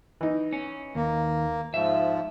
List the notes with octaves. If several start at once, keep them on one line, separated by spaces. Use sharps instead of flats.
E3 D#4
C#4
D#2 A#3
G#2 F3 E5